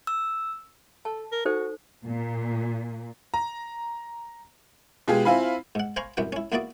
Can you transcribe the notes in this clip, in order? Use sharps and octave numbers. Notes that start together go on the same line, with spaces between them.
E6
A4 A5
A#4
D#4 F#4 A4 C5
A#2
A#5
B2 G#3 F4 G4 G#4
C4 E4 F4 F5 G#5 B5
G#2 F#5
C5 F5 G#5 A#5 B5 C#6
C2 F#2 E3 B4 G5
C#4 E4
E2 A#3 E4 F#4 D5 D#6